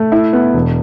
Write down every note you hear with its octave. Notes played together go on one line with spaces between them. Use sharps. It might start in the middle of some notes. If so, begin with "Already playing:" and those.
Already playing: A3
E4
B3
E1